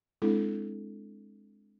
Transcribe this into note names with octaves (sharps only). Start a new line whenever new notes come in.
G#3 C4 D4 E4 A4